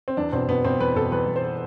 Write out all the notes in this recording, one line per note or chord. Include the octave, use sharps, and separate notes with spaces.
C4
E2 D4
B2 C4
B2 B3
B2 C4
E2 B4
B2 A4
E2 B4
E2
C5